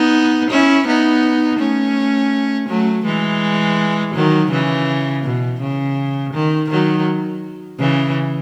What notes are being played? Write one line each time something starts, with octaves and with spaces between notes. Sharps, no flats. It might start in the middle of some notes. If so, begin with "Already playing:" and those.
Already playing: B3 D#4
C#4 E4
B3 D#4
A3 C#4
F#3 A3
E3 G#3
D#3 F#3
C#3 E3
B2
C#3
D#3
D#3 F#3
C#3 E3